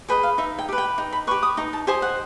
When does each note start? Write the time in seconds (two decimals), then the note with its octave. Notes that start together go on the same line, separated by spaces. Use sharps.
0.08 G#4 B4 D#5 G5
0.23 F5
0.38 D#4 E5
0.59 G5
0.69 G4 B4
0.78 G5
0.98 D#4
1.13 B5
1.27 B4 C#6
1.31 G4
1.43 D#6
1.57 D#4 A#5
1.73 A5
1.87 G4 C5 D#5 G#5
2.02 F#5